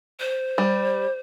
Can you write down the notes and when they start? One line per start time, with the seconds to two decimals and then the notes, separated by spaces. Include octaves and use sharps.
0.20 C5
0.58 G3